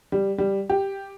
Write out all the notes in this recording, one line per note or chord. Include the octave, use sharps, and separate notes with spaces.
G3
G3
G4